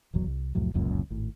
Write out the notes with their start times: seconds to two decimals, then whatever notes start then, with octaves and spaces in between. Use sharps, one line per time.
0.14 D#1 G#1 E2 F#3
0.27 C2
0.55 C2 F2 A2 F#3
0.74 F1 C#2 F#2 A#2
1.10 G#1 A2